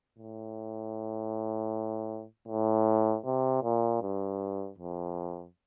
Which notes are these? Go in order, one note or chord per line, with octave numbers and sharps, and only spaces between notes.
A2
A2
C3
A#2
G2
F2